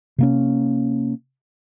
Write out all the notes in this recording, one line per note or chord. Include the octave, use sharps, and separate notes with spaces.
C3 A#3 C#4